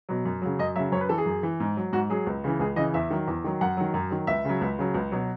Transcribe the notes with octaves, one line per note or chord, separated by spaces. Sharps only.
B2 F#3
F#2
C#3 F#3
F#2 D#5
C#3 F#3 E5
F#2 C#5
B4
E3 A4
G#4
F#2
E3
G#2
F#3
G#2 F#4
F#3 G#4
C#2
C#3 E3
C#2 G#4
C#3 E3 D#5
E2 E5
D#3 F#3
E2
D#3 F#3
F#2 F#5
D#3 F#3
F#2
D#3 F#3
C#2 E5
C#3 F#3
C#2
C#3 F#3
C#2
B2 F#3